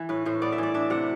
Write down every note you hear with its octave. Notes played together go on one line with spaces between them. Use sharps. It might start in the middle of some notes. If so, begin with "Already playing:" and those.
Already playing: E3
A2 B4
A2 C5
B3 D5
E5
E3 D5
D4 E5
C3 F#5